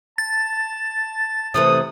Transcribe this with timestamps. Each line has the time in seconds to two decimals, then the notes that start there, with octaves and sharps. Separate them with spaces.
0.18 A5 A6
1.54 C3 E3 A3 D#6